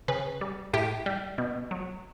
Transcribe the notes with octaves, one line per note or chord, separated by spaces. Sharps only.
C#3 B4
G3
A2 G4
G3
B2
F#3